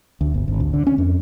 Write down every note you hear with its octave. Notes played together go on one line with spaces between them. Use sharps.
D2
G1
G#1
D2
D3
C#4
F2